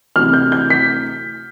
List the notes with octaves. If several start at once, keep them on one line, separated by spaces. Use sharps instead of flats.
D2 C3 E3 F6
G6
G6
B6